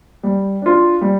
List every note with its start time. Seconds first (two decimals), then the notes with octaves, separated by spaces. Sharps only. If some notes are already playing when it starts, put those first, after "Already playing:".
0.23 G3
0.62 D4 F4
1.01 G3